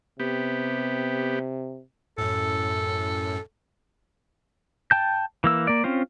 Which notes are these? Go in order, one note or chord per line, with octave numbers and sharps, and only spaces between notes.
C3 B3 G4
F#2 A2 A4
G5 A5 G6
E3 A#3 E6
A#3 D5
C4 C#4 F4 C5